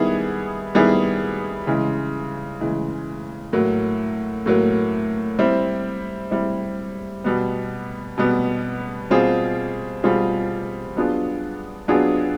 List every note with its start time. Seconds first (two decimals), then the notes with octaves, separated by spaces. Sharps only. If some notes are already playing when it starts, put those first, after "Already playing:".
Already playing: D#3 G3 B3 E4 G#4
0.75 D#3 G3 B3 E4 G#4
1.67 C#3 E3 G#3
2.60 C#3 E3 G#3
3.53 A2 F#3 A#3
4.46 A2 F#3 A#3
5.39 G3 C4 E4
6.31 G3 C4 E4
7.24 B2 G3 B3
8.18 B2 G3 B3
9.10 B2 G3 C4 F4 G#4
10.03 B2 G3 C4 F4 G#4
10.96 F#3 B3 D4 F4 G#4
11.88 F#3 B3 D4 F4 G#4